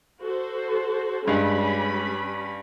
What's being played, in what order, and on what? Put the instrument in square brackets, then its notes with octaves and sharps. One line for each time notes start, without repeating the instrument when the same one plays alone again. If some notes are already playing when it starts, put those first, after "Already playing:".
[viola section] F#4 A4 C5
[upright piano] G2 [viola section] G3 C#4 B5 [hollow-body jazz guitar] G#3